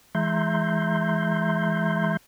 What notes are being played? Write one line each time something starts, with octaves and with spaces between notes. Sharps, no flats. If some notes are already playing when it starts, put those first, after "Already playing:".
E3 G#3 E5 A#5 C6 G6